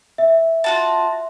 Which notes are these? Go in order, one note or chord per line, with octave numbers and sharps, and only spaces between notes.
E5
F4 F#4 A5